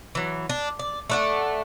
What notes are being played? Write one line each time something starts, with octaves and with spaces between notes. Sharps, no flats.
E3 F#3
D4
D5
A3 D4 F#5